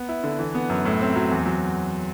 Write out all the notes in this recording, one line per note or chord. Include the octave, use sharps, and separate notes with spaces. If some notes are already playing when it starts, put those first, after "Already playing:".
Already playing: B3
E4
D3
E3
B3
F#2
A2
C4
F#3
E2
F#3